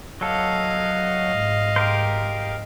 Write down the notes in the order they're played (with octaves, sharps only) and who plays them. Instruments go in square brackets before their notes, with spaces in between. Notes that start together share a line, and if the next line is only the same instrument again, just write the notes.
[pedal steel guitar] F#3 A4 [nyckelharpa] D#5 F5
[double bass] G#2
[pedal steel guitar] G4 A#4 C5